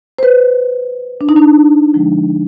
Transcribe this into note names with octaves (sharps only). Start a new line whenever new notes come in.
C5
B4
D4
D#4
D4
D3 F3 G#3